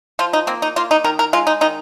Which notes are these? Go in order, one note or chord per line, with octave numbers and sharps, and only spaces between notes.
F3 F4
D#4
A#3 C4
D#4
A#3 F4
D#4
D#3 A#4
A#4
G#3 F4
D#4
D#3 D#4